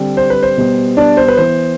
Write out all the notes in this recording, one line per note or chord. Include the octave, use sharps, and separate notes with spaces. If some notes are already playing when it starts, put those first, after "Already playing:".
Already playing: D3 G3 C4
C5
B4
C5
B2 G3 B3
D4 D5
C5
B4
E3 B3 C5